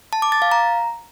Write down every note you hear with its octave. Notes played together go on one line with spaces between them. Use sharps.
A5
D6
A6
F5
A#5